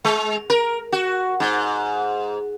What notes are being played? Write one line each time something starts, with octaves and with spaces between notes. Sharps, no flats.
G#3
A#4
F#4
G#2